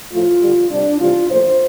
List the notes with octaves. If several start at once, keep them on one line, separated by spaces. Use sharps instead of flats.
A2 F3 A3 F4
D3 G3
C3 G3 D4
C3 E3 G3 F4
A#2 F3 A3 C5